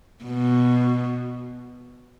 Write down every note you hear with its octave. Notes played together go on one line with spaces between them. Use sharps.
B2